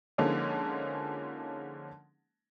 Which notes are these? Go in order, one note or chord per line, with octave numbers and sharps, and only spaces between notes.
D3 F3 G#3 A#3 C#4 D#4